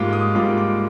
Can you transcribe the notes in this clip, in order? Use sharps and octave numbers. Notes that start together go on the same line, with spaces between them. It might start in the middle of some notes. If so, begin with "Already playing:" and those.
Already playing: G#2 G3 A#3 F4 D6
D#6
G#2 G3 A#3 F4 D6
D6